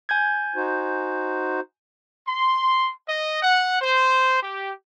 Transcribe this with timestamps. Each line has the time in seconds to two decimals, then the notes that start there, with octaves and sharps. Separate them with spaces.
0.09 G#5 G6 G#6
0.56 D#4 F#4 C5
2.27 C6
3.08 D#5
3.42 F#5
3.81 C5
4.42 G4